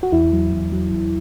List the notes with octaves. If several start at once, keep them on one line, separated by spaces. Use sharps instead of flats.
F#4
E2 E4
F#3
E2
F#3
E2